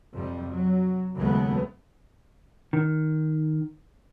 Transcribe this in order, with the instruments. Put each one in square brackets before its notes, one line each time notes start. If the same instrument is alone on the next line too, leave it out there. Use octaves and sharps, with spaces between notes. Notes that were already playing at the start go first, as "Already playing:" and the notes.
[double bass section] F2 C3 F3 G3
F#3
D#2 C#3 F#3 G#3 A3 B3
[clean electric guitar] D#3